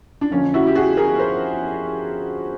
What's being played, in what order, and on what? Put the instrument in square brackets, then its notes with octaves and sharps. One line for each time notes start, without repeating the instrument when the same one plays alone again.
[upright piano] D4
F2 D3 F3 A#3 C#4
E4 F#4
G4
F#4 G#4
G#4 A#4
A#4 C5